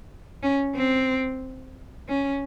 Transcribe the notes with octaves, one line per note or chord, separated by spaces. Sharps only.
C#4
C4
C#4